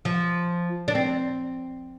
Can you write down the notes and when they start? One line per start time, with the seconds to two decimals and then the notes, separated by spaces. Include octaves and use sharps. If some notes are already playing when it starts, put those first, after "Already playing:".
0.05 F3
0.88 D4
0.95 C4